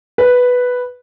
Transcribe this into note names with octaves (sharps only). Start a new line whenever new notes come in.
B4